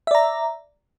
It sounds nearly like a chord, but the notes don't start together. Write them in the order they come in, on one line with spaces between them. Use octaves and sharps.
E5 D5 A#5